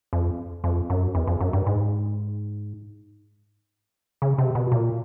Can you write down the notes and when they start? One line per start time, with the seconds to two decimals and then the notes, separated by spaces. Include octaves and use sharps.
0.13 F2
0.64 F2
0.90 F#2
1.15 E2
1.27 F2
1.41 F#2
1.53 G2
1.66 G#2
4.22 C#3
4.38 C3
4.55 B2
4.72 A#2